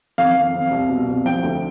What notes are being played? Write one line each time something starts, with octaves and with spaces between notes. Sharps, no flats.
F2 F5
F2
F2
C2
B2
C2
F3 G5
D2